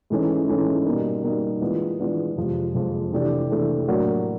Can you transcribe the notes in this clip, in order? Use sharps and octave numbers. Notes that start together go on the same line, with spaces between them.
G#2 E3 A3 C#4
G#2 E3 A3 C#4
B2 G3 A#3 D#4
B2 G3 A#3 D#4
E3 G#3 B3 D4 F4
E3 G#3 B3 D4 F4
F2 C3 F3 G#3
F2 C3 F3 G#3
C3 E3 A3 D4 G4
C3 E3 A3 D4 G4
A2 F#3 A#3 D4 F#4